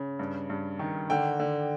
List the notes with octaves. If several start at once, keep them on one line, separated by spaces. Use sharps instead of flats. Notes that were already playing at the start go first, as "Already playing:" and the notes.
Already playing: C#3
G2
G2
D#3
D3 G5
D3